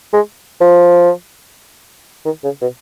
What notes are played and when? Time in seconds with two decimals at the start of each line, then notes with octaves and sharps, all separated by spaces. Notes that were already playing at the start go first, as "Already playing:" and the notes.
0.13 G#3
0.61 F3
2.25 D#3
2.44 C#3
2.61 B2